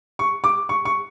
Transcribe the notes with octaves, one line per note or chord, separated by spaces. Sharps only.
C#6
D6
C#6
C#6